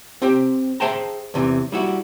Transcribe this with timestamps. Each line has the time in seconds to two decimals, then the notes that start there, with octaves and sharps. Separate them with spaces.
0.22 C4 G4 C5 G5
0.80 G#4 C5 E5 G5 A5 A#5
1.34 E2 C3 E3
1.72 G3 E4 F#4